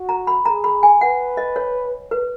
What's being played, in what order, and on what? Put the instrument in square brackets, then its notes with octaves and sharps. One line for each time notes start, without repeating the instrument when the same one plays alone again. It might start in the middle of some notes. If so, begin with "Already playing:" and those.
Already playing: [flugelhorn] F#4
[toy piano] A#5
B5
[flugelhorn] G#4 [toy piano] A#5
[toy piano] B5
G#5
[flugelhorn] B4 [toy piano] F#5
[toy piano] D#5
C#5
B4